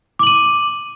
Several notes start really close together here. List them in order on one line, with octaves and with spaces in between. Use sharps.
D6 F#7 D#7